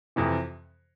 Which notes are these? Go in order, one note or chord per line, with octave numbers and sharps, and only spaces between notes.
F2 C3 E3